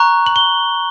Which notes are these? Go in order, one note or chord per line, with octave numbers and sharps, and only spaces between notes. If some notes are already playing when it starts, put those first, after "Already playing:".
Already playing: A#5 C#6 F#6
F#7
G7